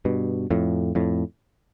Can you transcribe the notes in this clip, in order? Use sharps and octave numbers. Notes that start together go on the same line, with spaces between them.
G2 B2
F2 A2
F2 A2